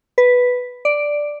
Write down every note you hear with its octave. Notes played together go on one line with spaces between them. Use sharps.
B4
D5